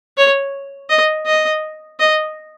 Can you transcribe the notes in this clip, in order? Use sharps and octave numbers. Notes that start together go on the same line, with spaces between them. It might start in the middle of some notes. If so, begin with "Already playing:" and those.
C#5
D#5
D#5
D#5